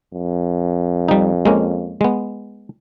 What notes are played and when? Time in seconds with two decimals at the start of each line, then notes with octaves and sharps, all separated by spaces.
0.14 F2
1.08 G3 D#4
1.45 G#3 A#3 C#4
2.01 G#3 B3